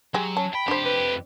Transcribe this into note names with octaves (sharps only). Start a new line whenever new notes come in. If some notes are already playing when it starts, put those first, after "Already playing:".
F#3 G#3 G4
C#4 A5
G5 B5
F2 D4 G4 C5
B4